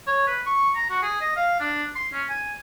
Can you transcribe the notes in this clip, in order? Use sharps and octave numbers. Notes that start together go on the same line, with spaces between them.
C#5
B4
C#6
A#5
F#4
G#4
D#5
F5
D4
C6
C#4
G#5